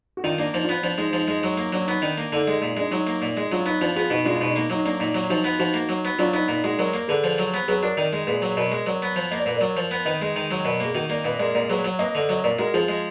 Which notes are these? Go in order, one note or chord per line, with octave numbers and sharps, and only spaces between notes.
F#4
D#3 D4 F4
A#3 D4
F3 D#4
D4 F4
B3
F3 D4
G#3 D#4
F3 D#4
G#3
F#3
A#3
F#3 D4
B3 D#4
D#3 D4
A#3
D3 D#4
G#3
A#2
G#3 D4
F#3 D#4
A#3
A#2
G#3
F#3 D4 F4
B3 D#4
F3 D4 F4
B3 F4 G#4
B2 D#4 F#4
G#3 D4 F4
B2 D#4
D4
A#3 D#4
F#3 D#4
A#3 D4
A#2 D#4
F#3
F3 D#4 F#4
B3
F3 D#4 F#4
A#3
F#3
B3
F#3 D4 F4
B3 D#4
A#2 D#4
G#3 D#4 F#4
F#3 A#4 D5
A#3
D3 G#4 B4
F3
F#3
B3
F#3 G#4 B4
D4 F#4 A#4
D#3 A#4 D5
G#3
A#2 G#4 B4
F#3
B2 A#4 D5
G#3
F#3 A#4 D5
B3
F3
A#3 D#5
D5
A#2 B4
F#3 A#4 D5
F3
B3
D#3 B4 D#5
G#3
D#3
F#3
B2 A#4 D5
A#3
G#4
D#3 F#4 A#4
A#3 A#4 D5
A#2 B4 D#5
G#3 A#4 D5
A#2 A#4 D5
F#3 G#4 B4
F#3
A#3 B4 D#5
D3
F#3 D#5
A#2 A#4 D5
G#3 F#4 A#4
F3 F4 G#4
G#3